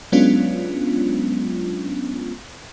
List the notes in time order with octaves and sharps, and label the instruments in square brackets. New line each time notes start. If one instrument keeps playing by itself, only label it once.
[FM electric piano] F#3 G#3 B3 C#4 D4 F4